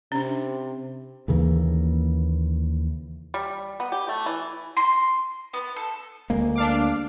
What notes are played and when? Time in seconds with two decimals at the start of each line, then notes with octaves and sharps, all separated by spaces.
0.12 C3 C#4 D4
1.28 D#2 C#3 E3 A#3
3.34 G3
3.80 B3
3.92 G4
4.09 A3
4.26 E3
4.77 C6
5.53 B3
5.76 A4
6.30 D2 G#3 A#3
6.56 D4 F5 D6